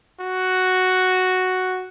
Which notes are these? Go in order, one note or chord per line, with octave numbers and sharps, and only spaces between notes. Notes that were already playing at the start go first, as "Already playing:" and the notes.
F#4